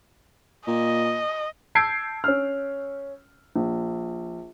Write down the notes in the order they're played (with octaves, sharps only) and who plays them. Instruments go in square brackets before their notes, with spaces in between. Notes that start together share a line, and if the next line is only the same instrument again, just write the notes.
[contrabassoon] A#2 [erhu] D#5
[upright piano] A5 E6 G6 G#6 C7 D7
C#4 F6
A#1